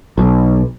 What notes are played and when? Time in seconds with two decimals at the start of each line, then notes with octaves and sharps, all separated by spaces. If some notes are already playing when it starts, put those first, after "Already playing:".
0.18 B1